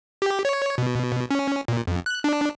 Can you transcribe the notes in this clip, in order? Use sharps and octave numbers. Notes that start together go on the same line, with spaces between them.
G4
C#5
B2
C#4
A#2
F2
F#6
D4